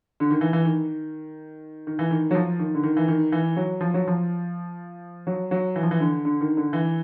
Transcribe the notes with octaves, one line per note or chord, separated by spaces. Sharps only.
D3
D#3
E3
E3
D#3
D#3
E3
D#3
F#3
F3
D#3
D3
D#3
E3
D#3
E3
F#3
F3
F#3
F3
F#3
F#3
E3
F3
E3
D3
D3
D#3
D3
E3